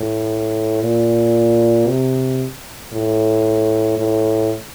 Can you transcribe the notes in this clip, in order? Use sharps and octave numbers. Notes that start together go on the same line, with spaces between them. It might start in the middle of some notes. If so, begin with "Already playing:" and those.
Already playing: A2
A#2
C3
A2
A2